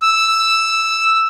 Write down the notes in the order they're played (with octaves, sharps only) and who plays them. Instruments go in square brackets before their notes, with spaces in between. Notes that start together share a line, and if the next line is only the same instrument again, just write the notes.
[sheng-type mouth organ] E6